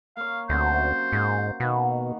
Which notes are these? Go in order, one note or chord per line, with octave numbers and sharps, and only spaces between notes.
A#3 C#5 F5
D2 C3 F#3 C#4 C5
G#2
B2 D#3 A#3 B3